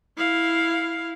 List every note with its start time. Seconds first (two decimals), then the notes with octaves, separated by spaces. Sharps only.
0.18 E4 F5